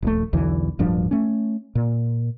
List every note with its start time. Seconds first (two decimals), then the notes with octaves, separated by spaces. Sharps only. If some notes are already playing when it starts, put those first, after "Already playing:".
0.03 D#1 A#1 A3
0.33 B1 E2 D3 E3
0.79 D1 G2 F3 D4
1.11 A3 C#4
1.75 A#2